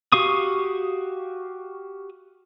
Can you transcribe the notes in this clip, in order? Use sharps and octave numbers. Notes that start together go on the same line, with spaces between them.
F#4 G4 F5 C#6 D#6